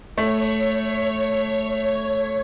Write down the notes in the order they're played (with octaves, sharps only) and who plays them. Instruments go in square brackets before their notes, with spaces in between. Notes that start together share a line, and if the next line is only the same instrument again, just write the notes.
[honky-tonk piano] A3 [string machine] C#5